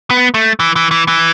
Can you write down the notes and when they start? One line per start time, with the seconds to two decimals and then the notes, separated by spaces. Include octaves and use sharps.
0.10 B3
0.34 A3
0.60 E3
0.76 E3
0.91 E3
1.08 E3